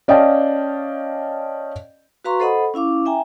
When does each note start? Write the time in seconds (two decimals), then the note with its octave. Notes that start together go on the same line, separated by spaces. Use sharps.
0.08 C#4 D5 D#5 F5 G5 A5
2.24 F#4 B4 F5 A#5 C6 C#6
2.40 A4 C5 D#5 F#5 B5 D#6
2.74 C#4 E4 F5 D6
3.06 E5 G5 G#5 A#5